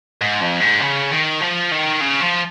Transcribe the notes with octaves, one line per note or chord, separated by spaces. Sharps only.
G#2
F2
G#2
C#3
D#3
F3
D#3
C#3
F3